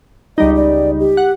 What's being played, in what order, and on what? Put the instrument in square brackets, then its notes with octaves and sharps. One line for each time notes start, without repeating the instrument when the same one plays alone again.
[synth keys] C#2 G3 D#4 [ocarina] D#5
[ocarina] D5
G4
[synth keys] F#5